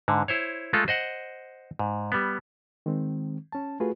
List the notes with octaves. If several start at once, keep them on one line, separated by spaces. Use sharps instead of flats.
G#2 D3
E4 C5 C#5
G#3 A3 F4 A4
C5 D#5 F#5
G#2
G3 B3
D#3 G#3 C4
C#4 A5
A3 F4 F#4 G#4 B4